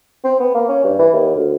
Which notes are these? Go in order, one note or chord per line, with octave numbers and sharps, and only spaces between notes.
C4
B3
A#3
C#4
G2
E3
D#2
D2